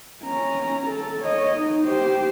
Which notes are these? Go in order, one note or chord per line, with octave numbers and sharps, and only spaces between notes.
C#4 A#5
A4
C#5 D#5
D#4
G4 C5